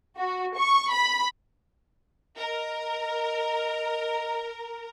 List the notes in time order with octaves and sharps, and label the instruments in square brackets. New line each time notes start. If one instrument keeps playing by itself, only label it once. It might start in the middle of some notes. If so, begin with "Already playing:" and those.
[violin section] F#4
C#6
B5
[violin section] A#4 [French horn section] D#5